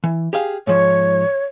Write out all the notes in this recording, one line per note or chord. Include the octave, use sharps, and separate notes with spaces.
E3
G4 G#4 F5
G#2 F3 C#5